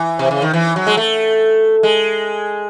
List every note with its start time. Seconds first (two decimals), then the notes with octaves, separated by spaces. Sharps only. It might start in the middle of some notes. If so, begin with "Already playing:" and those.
Already playing: E3
0.19 C3
0.31 C#3
0.42 D#3
0.53 E3
0.76 F#3
0.87 G#3
0.97 A3
1.83 G#3